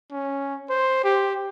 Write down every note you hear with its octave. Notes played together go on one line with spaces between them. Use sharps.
C#4
C5
G4